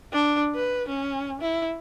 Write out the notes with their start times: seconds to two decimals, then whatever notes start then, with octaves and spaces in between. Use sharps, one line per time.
0.12 D4
0.55 B4
0.88 C#4
1.41 E4